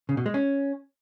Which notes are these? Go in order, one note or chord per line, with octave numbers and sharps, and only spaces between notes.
C#3
B2
G#3
C#4